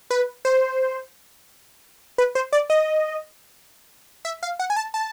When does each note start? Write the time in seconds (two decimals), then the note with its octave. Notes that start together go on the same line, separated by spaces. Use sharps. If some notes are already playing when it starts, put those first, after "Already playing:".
0.10 B4
0.45 C5
2.18 B4
2.35 C5
2.53 D5
2.70 D#5
4.25 E5
4.43 F5
4.59 F#5
4.70 G#5
4.76 A5
4.94 A5